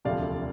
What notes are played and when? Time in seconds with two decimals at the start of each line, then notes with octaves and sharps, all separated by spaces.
0.05 E1 D2 C3 F3 A3 D5 F5